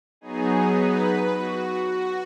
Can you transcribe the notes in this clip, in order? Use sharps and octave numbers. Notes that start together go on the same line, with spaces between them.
F#3 B3 D#4 G#4
B4
F#4
F#4